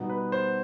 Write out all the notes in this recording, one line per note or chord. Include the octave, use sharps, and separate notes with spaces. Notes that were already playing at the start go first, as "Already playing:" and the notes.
Already playing: B2 G3 B3 D#4
B4
C5